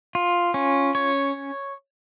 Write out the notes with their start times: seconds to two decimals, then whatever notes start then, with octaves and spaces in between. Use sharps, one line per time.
0.15 F4
0.54 C#4
0.95 C#5